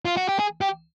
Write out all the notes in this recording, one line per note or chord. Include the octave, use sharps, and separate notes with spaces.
F4
F#4
G4
G#4
G4